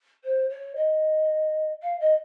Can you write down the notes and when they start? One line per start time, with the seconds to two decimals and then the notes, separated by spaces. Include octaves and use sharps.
0.24 C5
0.49 C#5
0.76 D#5
1.83 F5
2.00 D#5